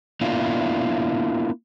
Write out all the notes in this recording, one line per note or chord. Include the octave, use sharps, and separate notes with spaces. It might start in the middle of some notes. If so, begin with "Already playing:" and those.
A#3 B3 D4 E4 F4